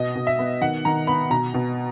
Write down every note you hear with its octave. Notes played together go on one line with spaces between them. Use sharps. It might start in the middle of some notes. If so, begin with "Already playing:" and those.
Already playing: B2 D#5
B2
E5
B3
D#3 F#5
D#3 A#5
B3 B5
B2 A#5
B2